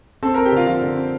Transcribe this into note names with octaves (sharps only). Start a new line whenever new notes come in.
C4 A4 A5
C4 A#4 A#5
G4 G5
D3 F4 F5
F3 F4 F5
D3
C4